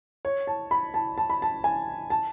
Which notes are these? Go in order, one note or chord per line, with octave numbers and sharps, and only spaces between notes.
C#5
A5
B5
A5
A5
B5
A5
G#5
A5